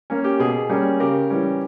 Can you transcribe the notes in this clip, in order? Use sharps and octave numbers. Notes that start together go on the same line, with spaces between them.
A#3 C#4
G4
B2 G#4
G3 A#3 C#4
C#3 G4 A#4
E3 G3 C#4